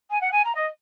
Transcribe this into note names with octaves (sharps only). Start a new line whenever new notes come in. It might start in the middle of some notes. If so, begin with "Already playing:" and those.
G#5
F#5
G#5
A#5
D#5